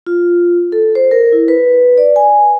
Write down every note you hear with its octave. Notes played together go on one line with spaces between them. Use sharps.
F4
A4
C5
A#4
E4
B4
D5
G#5